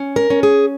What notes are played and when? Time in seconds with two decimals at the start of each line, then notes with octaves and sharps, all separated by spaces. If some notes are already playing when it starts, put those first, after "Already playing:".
Already playing: C#4
0.16 A#4
0.30 C#4
0.43 G#4